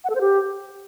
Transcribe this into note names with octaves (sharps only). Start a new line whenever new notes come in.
F#5
A4
C5
G4